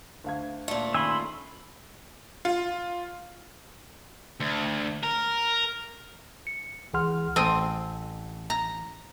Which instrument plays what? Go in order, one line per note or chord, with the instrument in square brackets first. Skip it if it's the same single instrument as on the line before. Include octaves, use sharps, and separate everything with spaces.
[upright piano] D2 F5 G#6
[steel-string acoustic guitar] A#2 A3
[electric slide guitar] D#3 C#4 G#5 [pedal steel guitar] B5 C6 E6
[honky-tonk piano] F4
[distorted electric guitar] D2
A#4
[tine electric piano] C#7
C#2 E3 G#4 F#5 C6 F6
[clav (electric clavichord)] A1 A4 [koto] C4 D#5
[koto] A#5